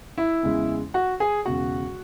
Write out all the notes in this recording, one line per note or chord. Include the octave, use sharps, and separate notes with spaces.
E4 E5
E2 C#3 G#3
F#4 F#5
G#4 G#5
E1 E2 C#3 F#4 F#5